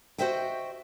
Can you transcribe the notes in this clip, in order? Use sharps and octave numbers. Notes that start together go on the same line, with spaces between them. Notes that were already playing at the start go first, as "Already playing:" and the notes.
F#4 G#4 C5 D#5 E5 G5